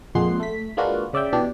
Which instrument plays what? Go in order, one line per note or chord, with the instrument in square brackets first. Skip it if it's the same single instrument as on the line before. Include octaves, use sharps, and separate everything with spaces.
[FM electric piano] F2 A#2 G#3 F#5 C6 C7
A3 B6
G#3 A#3 D4 F4 F#4 B4
C#3 D5 E5 G5
B2 E3 D4 G4